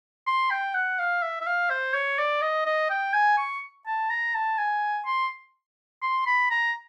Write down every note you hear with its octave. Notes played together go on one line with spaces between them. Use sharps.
C6
G5
F#5
F5
E5
E5
F5
C5
C#5
D5
D#5
D#5
G5
G#5
C#6
A5
A#5
A5
G#5
C6
C6
B5
A#5